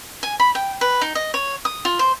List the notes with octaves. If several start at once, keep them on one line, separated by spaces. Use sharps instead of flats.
G#5
B5
G5
B4
D#4
D#5
C#5
D#6
F4
C5